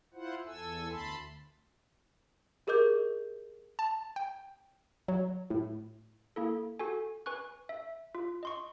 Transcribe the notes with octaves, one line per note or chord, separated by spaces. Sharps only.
E4 F4 C5 F#5
E2 A4 G#5 E6
D2 A5 B5 C6
G4 G#4 A#4 D#5 D6 G6
A5
G5
F#3
A2
A#3 E4 A4
F#4 A4 G#5
B4 G#5 C#6 F#6
E5
F4
D#5 C6 C#6